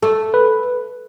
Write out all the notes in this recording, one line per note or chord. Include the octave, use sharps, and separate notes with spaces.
A3 A4
B4